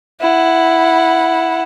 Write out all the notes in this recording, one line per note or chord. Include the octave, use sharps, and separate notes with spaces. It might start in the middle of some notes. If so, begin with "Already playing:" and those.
E4 F#5